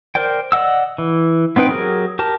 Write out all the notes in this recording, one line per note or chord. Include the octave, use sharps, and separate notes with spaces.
A#4 C5 D5 G5
D5 D#5 F#5 E6
E3
B3 C4 D#4 B4 G5
F#3 G4 G#4 A#4
G4 A#4 A5